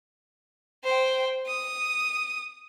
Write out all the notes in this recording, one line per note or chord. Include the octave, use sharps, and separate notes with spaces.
C5 G5
D#6